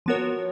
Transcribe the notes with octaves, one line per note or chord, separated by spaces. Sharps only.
F3 B3 F#4 A#4 C#5